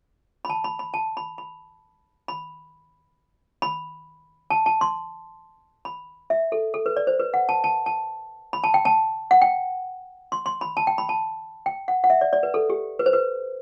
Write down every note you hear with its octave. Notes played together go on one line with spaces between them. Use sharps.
B5
A5
B5
B5
A5
B5
B5
B5
B5
A5
A5
C6
B5
E5
A4
A4
B4
D5
C5
B4
F#5
A5
A5
A5
B5
A5
G5
A5
F#5
G5
C6
C6
B5
A5
G5
B5
A5
G5
F#5
F#5
E5
D5
D5
B4
A4
G4
B4
C5
B4